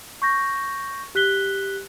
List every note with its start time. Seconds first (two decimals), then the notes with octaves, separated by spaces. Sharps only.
0.22 C#6 G6 A#6
1.15 G4 F#6 B6 G7